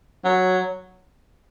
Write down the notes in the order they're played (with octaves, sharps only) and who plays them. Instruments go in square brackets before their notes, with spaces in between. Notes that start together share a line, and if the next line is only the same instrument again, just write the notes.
[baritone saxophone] F#3